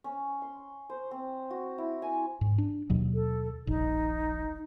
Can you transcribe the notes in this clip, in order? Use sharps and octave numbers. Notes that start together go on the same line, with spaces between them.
C#4
C6
C5
C4
F#4
E4
G#5
G#2
D4
D#2 B2 F#3
A4
D#1 A#1 D#4